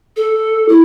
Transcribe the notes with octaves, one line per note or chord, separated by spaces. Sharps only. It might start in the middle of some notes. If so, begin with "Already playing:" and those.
A4
E4